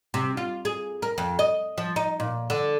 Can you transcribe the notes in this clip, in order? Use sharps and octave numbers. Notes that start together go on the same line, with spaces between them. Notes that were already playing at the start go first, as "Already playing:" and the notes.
C3
F4
G#4
A#4
F2
D#5
F3
D#4
A#2
D3